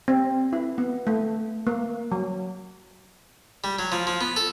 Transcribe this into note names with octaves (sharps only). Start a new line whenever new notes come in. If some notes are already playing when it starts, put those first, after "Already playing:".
C4
E4
B3
A3
A#3
F#3
G3
F#3
F3
F3
B3
A4